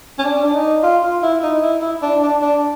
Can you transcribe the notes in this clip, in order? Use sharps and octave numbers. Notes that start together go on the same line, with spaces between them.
C#4
D4
D4
D#4
F4
F4
E4
D#4
E4
E4
D4
D4
D4